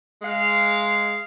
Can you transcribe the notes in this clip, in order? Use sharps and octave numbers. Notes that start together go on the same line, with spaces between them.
G#3 F5